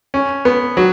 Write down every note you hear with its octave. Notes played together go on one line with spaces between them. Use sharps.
C#4
B3
F#3